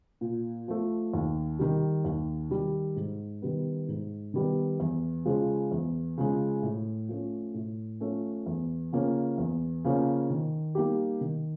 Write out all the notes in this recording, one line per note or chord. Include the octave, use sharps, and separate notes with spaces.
A#2
F3 A3
D#2
D#3 G3
D#2
D#3 G3
G#2
D#3 G3 B3
G#2
D#3 G3 B3
E2
C#3 F3 G#3
E2
C#3 F3 G#3
A2
F3 A3 C#4
A2
F3 A3 C#4
E2
C#3 F3 A#3 C#4
E2
C#3 F3 A#3 C#4
D#3
G3 A#3 D#4 G4
D#3